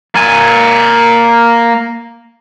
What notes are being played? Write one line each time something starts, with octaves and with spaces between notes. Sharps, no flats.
A#3 G#5